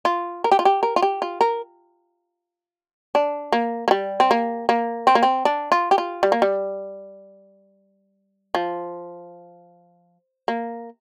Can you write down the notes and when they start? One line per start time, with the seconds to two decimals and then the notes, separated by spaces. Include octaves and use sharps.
0.05 F4
0.44 A#4
0.51 G4
0.59 F4
0.65 G4
0.83 A#4
0.96 F4
1.02 G4
1.22 F4
1.41 A#4
3.15 D4
3.52 A#3
3.88 A#3
3.91 G3
4.20 C4
4.31 A#3
4.69 A#3
5.07 C4
5.15 A#3
5.23 C4
5.45 D4
5.72 F4
5.91 G4
5.98 F4
6.23 G3
6.32 A#3
6.42 G3
8.55 F3
10.48 A#3